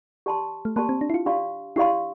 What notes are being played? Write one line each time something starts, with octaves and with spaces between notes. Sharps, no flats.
G4 D5 A5 C6
A3
A#3 G4 D5 A5 C6
C4
D4
E4
F4
D4 G4 D5 F5 C6
D4 E4 G4 D5 F5 C6